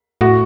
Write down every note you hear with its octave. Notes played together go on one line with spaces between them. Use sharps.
A2 F#4